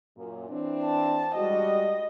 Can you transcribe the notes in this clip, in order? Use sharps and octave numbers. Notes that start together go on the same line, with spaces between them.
F#2 A#2
E3 C4 D4
A5
G3 G#3 F#4 D#5